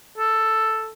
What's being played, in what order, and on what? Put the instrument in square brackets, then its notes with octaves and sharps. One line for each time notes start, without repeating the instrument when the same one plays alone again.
[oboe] A4